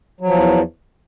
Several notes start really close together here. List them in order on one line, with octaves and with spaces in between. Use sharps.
F#3 F3 E2